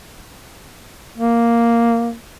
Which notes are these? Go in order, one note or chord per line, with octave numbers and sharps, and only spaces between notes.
A#3